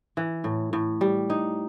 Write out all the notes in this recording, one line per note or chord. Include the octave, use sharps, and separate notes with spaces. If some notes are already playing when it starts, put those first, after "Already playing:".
E3
A2
A2
G3
D#4